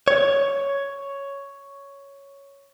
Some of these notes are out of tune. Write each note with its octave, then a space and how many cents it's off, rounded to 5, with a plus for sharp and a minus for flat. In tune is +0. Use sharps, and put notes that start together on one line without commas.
C#5 +5